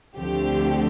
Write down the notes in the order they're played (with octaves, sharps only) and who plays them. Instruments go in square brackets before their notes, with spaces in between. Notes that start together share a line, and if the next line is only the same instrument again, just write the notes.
[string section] D2 D3 F3 A3 C4 G4